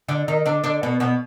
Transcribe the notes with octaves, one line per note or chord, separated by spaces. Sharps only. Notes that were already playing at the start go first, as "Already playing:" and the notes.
D3 D4
D#3 D#4
D3 D4
D3 D4
B2 B3
B2 B3